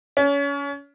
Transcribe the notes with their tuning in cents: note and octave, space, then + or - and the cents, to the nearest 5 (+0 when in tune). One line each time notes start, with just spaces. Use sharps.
C#4 +30